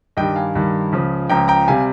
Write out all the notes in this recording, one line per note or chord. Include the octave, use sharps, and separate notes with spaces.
G2 D#3 G3 D#5 G5
F5 G#5
G2 D#3 G3
C#2 C#3 F3
C#2 C#3 F3 G5 A#5
G5 A#5
C3 G3 F5 G#5